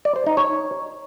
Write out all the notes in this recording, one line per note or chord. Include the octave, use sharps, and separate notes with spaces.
D5
C5
D#4
C#5